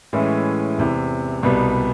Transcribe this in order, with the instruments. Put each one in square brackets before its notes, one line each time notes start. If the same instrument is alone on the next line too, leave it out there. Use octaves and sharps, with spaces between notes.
[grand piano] A2 E3 G#3 C#4 E4
E2 C3 E3
C2 B2 G3 B3